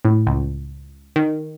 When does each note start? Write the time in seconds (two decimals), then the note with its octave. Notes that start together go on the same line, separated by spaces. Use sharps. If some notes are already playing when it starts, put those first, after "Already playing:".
0.05 A2
0.27 C#2
1.16 D#3